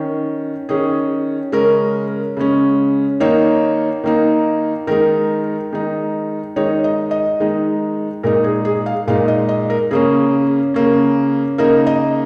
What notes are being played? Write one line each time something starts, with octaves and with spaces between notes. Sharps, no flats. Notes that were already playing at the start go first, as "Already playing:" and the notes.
Already playing: D#3 C#4
D#3 C#4 G#4
C#3 G#3 C#4 A#4
C#3 G#3 C#4
D#3 A#3 D#4 C#5
D#3 A#3 D#4
D#3 G#3 D#4 A#4
D#3 G#3 D#4
D#3 G#3 D#4 C#5
D#5
D#5
D#3 G#3 D#4
A#2 G#3 D#4 A#4
G#4
G#4
F5
A#2 G#3 D#4 F5
D#5
D#5
A#4
C#3 A#3 C#4 G#4
C#3 A#3 C#4
C#3 A#3 D#4 A#4
D#5